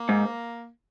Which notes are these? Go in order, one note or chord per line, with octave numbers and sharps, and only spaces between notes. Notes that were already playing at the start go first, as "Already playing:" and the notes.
Already playing: A#3
G#2